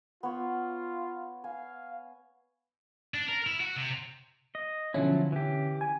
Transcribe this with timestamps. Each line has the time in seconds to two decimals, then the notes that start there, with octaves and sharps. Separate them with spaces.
0.23 B3 F4 C#5
1.44 F5 G#5
3.14 D4
3.28 A#4
3.47 E4
3.60 F#4
3.76 C3
4.55 D#5
4.94 B2 D3 F3 F#3 C#4 E4
5.32 E3 G4
5.81 G#5